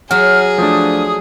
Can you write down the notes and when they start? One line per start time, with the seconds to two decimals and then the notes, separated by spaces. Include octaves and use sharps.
0.11 F#3 G#4 F#5 F6
0.58 F3 A3 D4 D#6